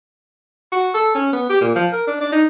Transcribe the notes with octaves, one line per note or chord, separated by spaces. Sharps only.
F#4
A4
C#4
B3
G4
A#2
F3
A#4
D4
D4
D#4